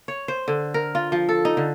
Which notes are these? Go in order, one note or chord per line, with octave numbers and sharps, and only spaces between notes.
C#5
C5
D3
A#4
F4
F3
A4
D#4
D3